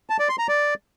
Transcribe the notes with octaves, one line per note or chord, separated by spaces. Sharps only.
A5
D5
C6
A#5
D5